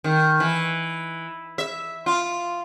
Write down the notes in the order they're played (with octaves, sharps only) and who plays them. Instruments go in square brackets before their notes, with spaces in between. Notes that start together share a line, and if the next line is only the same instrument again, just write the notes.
[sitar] D#3
E3
E5
F4